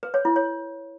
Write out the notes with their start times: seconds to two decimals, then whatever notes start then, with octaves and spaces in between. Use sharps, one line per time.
0.03 B4
0.14 C#5
0.25 E4
0.36 C#5